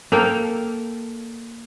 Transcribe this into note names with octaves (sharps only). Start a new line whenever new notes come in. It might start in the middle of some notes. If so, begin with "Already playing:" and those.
A#3 A4 F5 G5